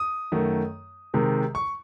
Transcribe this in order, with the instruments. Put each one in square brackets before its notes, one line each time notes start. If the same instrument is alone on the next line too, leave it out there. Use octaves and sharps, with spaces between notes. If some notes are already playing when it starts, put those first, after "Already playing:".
Already playing: [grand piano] D#6
F#2 D#3 A3
C3 D#3 G#3
C#6